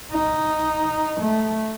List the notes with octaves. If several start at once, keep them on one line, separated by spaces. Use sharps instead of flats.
D#4
A3